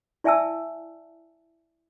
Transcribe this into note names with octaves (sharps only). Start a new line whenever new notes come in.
E4 D5 E5 G#5 A5 E6